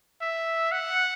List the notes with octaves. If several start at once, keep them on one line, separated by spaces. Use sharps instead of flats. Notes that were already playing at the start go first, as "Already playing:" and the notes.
E5
F#5